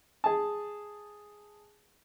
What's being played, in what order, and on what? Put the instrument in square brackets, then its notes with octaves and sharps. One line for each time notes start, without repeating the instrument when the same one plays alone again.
[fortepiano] G#4 A5